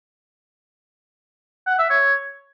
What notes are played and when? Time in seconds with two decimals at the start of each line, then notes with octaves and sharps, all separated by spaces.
1.67 F#5
1.78 E5
1.90 C#5